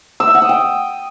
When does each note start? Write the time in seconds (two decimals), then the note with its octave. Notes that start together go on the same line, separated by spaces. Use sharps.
0.20 E6
0.27 E5
0.35 F#5
0.42 D#6
0.49 G5